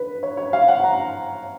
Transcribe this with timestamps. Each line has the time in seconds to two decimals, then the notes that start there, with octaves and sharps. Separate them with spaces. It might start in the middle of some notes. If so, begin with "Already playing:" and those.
Already playing: B4
0.23 C#5
0.37 C#5
0.53 F5
0.68 F#5
0.84 A#5